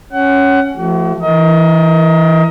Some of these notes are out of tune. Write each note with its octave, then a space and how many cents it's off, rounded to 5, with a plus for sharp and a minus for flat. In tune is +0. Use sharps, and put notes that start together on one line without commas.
C#4 +0 F#5 +25
F3 -25 A3 +0 F#4 +45
E3 +0 A#4 +0 D#5 +30